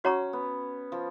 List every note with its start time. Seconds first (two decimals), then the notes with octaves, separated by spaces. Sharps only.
0.04 C#4 F#4 C#5 F#5 A#5 C#6
0.33 B3
0.92 F3